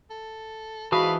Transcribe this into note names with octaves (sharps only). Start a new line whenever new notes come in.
A4
G#2 E3 F#4 F5 A5 B5 D#6